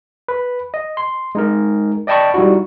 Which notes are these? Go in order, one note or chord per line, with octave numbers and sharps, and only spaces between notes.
B4 B5
D#5
C6
G#3 D#4 A#4
D5 D#5 G5 A5 B5 C#6
G3 D#4 E4 F#4